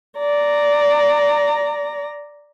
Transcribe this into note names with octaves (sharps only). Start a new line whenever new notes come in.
D5 A#5